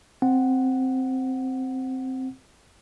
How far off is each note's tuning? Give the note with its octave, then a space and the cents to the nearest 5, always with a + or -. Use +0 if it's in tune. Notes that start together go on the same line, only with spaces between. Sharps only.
C4 +0 F#5 +0